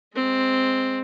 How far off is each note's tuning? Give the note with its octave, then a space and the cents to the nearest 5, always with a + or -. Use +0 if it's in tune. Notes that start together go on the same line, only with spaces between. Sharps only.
G#3 +0 C4 +0